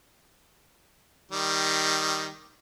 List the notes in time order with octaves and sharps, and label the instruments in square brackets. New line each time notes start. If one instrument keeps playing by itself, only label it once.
[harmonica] D#3 G3